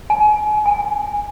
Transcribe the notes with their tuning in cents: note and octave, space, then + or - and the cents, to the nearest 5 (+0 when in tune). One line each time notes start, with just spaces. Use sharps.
G#5 +30
G#5 -15